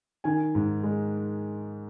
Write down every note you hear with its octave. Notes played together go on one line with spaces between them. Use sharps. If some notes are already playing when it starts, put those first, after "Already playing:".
D#3 G#5
G#2
G#3